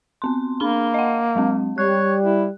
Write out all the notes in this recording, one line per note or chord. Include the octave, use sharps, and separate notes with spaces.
B3 C4 C6
A#3 D4 B5 G7
D#5 F#5
F#3 G#3 C4
G3 C#5 F#6
E4